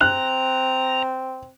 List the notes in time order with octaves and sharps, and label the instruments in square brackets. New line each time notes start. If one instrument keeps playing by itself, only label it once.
[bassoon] C4 [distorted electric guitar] A#5 [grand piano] F#6